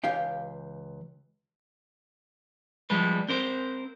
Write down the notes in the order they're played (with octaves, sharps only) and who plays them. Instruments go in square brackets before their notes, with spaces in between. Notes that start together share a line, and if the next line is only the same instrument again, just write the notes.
[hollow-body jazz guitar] C#2 E3 G4 F5 G5
[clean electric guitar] F3 G3 G#3 B4
C4 A#4 C5